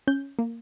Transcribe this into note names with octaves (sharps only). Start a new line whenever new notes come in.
C#4 G6
A#3